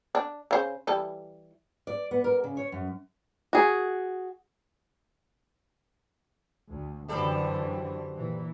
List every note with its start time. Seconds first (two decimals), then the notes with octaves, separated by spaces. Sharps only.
0.15 D4
0.51 C#3 C5
0.87 E3 G3 A4
1.87 D5
2.11 B3
2.24 A#4
2.44 C#3
2.57 C#5
2.72 F#2
3.53 F#4 G#4
6.70 D2
7.08 F#2 D3 E3 G3 C4 A4
8.15 A#2 E3